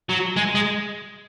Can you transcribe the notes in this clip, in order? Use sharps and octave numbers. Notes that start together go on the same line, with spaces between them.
F#3
G#3
G#3